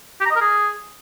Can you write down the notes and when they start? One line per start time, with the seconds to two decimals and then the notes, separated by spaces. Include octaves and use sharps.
0.21 G4
0.26 A#5
0.31 D#5
0.36 A#4
0.41 G#4